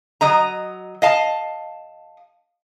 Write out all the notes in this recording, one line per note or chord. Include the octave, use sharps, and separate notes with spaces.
F#3 D#5 A#5
D#5 F5 A5